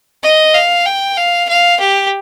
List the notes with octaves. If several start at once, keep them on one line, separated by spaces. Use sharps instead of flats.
D#5
F5
G5
F5
F5
G4